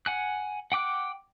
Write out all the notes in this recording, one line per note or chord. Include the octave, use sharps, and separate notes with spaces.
F#5 G#5 F#6
F#5 G5 D6 F#6